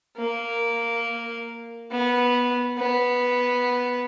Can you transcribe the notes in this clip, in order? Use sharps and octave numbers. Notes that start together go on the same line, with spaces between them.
A#3
B3
B3